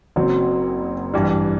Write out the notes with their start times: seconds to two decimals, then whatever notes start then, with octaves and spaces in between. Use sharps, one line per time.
0.16 F#1 F#2 F#3 C4
1.13 A1 G2 E3 G3